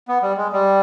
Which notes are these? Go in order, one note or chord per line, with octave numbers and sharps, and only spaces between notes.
B3
G3
G#3
G3